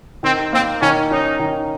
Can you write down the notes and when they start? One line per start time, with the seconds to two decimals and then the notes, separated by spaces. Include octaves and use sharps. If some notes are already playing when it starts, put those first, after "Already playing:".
0.23 D#3 C4
0.53 A#3 C4
0.82 D#3 C#4
1.11 C#4 D#4
1.39 D#3